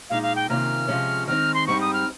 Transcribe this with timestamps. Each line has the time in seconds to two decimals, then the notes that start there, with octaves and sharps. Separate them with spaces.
0.10 A#2 G#3 D#4 F5
0.23 F5
0.36 G5
0.49 C3 D#3 A#3 C#4 F4 F6
0.88 C3 F3 G#3 C#4
1.27 D#3 G#3 C4 D#4 F6
1.54 C6
1.67 G#2 G3 C4 D#4 C#6
1.81 D#6
1.94 F6